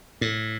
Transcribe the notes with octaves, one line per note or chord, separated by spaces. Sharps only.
A2